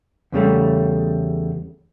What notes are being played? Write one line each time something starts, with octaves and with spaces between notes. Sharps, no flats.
E2 C#3 G3 A3